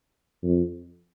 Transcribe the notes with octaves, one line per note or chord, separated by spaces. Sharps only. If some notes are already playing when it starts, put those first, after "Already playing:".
F2